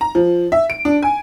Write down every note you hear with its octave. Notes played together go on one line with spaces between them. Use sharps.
A#5
F3
E5
D7
D4
G#5